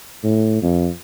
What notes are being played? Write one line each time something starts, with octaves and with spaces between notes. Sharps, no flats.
A2
F2